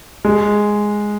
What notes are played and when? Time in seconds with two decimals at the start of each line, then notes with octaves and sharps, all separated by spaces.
0.25 G#3